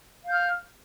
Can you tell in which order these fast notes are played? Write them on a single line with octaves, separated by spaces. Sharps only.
F5 G6 F6